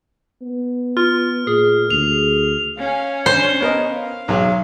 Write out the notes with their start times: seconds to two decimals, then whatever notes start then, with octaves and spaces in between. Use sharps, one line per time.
0.42 B3
0.97 F4 F6
1.47 A#2 G#4
1.90 D2 F7
2.78 C#4 F5 G#5
3.26 D4 C5
3.61 B3 A#4 D#5
3.91 F5
4.28 B1 F#3 G#4